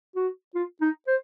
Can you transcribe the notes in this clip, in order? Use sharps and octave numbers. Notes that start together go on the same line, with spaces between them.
F#4
F4
D#4
C5